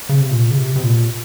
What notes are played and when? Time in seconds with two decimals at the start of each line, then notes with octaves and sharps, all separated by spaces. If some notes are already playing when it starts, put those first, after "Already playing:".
0.09 C#3
0.21 C3
0.31 A#2
0.50 C#3
0.57 C3
0.76 C3
0.83 A#2